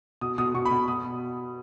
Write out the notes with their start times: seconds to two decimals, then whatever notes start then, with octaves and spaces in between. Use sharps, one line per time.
0.21 B2 D#6
0.38 B2 D#6
0.54 B2 C#6
0.65 B5
0.71 B2
0.88 B2 D#6